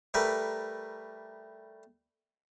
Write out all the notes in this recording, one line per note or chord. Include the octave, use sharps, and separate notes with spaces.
G3 A3 A#4 B4